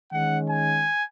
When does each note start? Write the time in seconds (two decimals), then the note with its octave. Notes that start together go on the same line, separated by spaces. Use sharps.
0.10 D#3 G#3 C#4 F#5
0.48 G#5